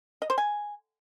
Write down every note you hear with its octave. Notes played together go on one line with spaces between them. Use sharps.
D#5
C5
G#5